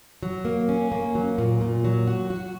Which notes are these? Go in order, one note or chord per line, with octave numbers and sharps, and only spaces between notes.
F#3
A#3
C#4
A#3
F#3
A#2
A#2
F#3
F#4
F#4